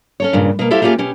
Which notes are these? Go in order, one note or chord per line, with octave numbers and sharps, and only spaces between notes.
C#4 A4 C#5
G2 A#2 C#3
B2 A#3
E4 G4 A4 C5 E5 F5
A3 A#3 C#4 F4 G4 G#4
B2 C#4 G4